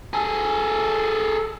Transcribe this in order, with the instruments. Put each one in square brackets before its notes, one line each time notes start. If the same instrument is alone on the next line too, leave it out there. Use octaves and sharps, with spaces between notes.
[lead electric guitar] G#4 A4